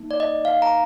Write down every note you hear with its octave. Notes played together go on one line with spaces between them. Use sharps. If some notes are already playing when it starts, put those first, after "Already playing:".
Already playing: A#3 D#4
D5
D#5
F5
A#5